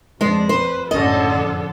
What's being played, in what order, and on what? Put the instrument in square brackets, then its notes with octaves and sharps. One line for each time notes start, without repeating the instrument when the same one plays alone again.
[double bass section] F2 [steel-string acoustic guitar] G#3 C5 [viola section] D4
[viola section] B4 [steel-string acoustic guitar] C5
[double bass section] F#1 A2 C#4 [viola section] D3 A4 [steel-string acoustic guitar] D#5
[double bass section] F2